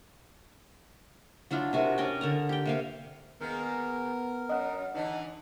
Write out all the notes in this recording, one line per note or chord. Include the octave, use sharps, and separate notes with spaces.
F#3 D4 E4 F4
C3 F#4 A#4
C#4 D5 D#5 G5
D3 A#4 A#5
G4 G5
C3 A#3 F5
D#3 G#3 A#3 B3 A#4
F#2 D#5 F#5
D3 E3 A3 D#4